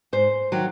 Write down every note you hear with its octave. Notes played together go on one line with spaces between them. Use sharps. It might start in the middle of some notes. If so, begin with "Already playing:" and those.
G#2 C5
D#3 F#3 A#3